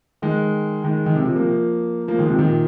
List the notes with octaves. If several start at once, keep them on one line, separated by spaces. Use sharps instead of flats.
D#3 G#3
D#3 G#3
D#3
C3
C3 F3
F3 A#3
F3 A#3
D#3 G#3
C3 F3
A#2 D#3